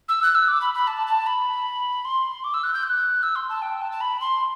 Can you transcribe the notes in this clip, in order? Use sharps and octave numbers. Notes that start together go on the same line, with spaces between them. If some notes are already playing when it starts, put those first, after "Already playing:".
E6
F#6
E6
D6
B5
B5
A5
A5
B5
C6
D6
E6
F#6
G6
F#6
E6
C6
A5
G5
A5
A5
B5
C6